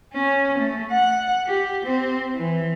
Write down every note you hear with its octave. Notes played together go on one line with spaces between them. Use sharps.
C#4
A3
F#5
G4
C4
E3